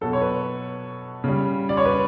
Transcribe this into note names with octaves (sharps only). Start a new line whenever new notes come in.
B2 F#3 A4
C#5
B4
C#3 G3
D5
C#5
B4